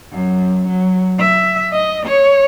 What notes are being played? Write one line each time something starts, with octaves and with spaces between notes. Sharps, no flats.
F#2
F#3
E5
D#5
C#5